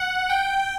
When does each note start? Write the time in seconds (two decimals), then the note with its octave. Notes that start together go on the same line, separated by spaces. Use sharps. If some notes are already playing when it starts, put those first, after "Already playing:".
Already playing: F#5
0.29 G5